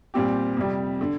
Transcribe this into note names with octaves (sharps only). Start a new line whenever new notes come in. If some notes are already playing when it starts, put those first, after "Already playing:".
A#2 G3 C4 G4
F2 C3 G3
D3